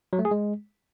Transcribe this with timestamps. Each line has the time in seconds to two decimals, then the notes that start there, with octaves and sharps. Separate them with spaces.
0.13 F#3
0.19 A3
0.25 G#4
0.31 G#3